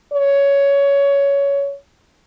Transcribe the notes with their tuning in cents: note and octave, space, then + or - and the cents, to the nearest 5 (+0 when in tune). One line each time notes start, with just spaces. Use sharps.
C#5 +15